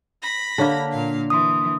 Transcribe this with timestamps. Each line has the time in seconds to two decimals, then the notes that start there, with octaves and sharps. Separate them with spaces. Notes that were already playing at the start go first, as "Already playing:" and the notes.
0.22 B5 A#6
0.58 D3 A#3 D4 C#5 A5
0.92 A#2 F5
1.30 E3 C6 D#6